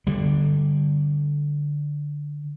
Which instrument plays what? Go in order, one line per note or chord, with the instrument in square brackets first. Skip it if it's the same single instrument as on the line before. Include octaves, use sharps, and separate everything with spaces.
[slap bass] D3 G3